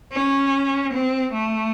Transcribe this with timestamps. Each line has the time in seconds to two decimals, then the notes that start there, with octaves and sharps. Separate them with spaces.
0.13 C#4
0.93 C4
1.33 A3